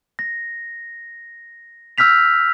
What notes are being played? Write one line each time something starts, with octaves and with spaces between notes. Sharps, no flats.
A#6
E6 F6 G6 B6 F7